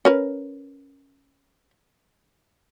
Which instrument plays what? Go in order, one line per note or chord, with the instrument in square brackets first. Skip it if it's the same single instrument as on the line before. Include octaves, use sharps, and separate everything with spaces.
[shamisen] C#4 A#4 B4